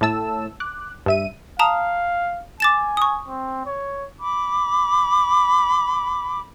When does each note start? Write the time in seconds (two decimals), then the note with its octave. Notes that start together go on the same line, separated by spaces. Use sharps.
0.01 A2 A3 A5 E6
0.60 D6 F#6
1.06 G2 E5 D#7
1.59 F5 A5 A#5 D#6
2.60 G#5 D6 A6 E7
2.97 C#6 D#6
3.28 C4
3.66 C#5
4.20 B5 D6